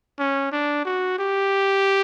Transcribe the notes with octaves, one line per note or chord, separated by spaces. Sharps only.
C#4
D4
F#4
G4